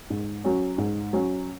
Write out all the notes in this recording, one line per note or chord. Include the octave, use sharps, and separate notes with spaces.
G#2
F#3 C#4
G#2
F#3 C#4